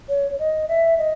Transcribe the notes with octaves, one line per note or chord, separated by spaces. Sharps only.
C#5
D#5
E5
D#5